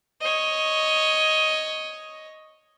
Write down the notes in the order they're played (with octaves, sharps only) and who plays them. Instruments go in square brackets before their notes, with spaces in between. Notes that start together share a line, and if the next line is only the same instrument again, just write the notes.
[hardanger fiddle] C#5 D#5